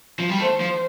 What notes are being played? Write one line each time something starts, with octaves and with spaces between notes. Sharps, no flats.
F3
G3
A3 C5
F3